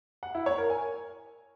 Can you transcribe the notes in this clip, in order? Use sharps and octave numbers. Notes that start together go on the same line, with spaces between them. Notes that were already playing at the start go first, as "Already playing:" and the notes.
F#5
E4
C#5
A#4
G#5